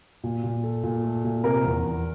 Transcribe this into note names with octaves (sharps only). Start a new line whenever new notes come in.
A#2
A#2
A4
A#2
A3
A#2
C3 A#4
E2
E2